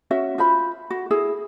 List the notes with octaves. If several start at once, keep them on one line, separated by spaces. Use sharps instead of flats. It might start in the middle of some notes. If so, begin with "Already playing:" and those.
C#4 F#4 E5
F4 C5 E5 B5
F#4
E4 G#4